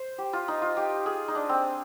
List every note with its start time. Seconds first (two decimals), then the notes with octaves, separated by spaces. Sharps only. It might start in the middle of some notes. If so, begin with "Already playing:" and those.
Already playing: C5
0.18 G4
0.33 F4
0.48 D#4
0.62 F4
0.77 G4
1.06 G#4
1.28 D#4
1.35 D4
1.49 C4